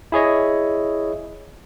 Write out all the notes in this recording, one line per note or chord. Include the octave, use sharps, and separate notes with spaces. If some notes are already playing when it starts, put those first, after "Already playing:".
E4 G#4 C#5 D#5